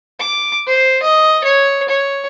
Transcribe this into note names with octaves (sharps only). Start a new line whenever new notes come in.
D6
C5
D#5
C#5
C#5